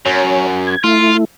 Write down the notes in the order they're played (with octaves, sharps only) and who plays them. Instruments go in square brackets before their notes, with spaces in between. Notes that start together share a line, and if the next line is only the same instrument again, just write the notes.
[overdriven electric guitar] F#2 [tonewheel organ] C#5
[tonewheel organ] G#6
[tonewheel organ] A3 E4 [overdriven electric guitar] F4